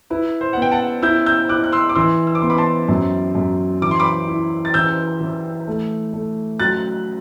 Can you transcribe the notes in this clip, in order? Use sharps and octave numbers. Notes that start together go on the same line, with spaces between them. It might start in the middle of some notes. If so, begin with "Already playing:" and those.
E4 B4
C5
B3 F#5
G5
F#5 A5
E4 E6 G6
E6 G6
E4 D6 F#6
F#6
C6 E6
D6
E3 C6 E6
E6
D6
B3 C6
B5 D6
A5 C6
F#2
F#2
E3 D6
C6
B5 D6
E4
A6
E3 E6 G6
E3
A3
A3
F#3 F#6 A6